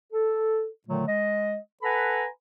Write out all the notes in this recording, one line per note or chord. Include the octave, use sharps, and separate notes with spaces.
A4
A#2 D3 D#3 F#3 A3
G#3 D#5
A4 B4 F#5 G#5 A#5 B5